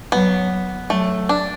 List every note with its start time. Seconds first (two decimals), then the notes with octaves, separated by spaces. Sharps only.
0.12 F#3 B3
0.90 F#3 A3
1.29 D4